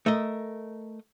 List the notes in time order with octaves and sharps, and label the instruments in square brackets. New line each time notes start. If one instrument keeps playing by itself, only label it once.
[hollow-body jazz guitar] A3 A#4 D#5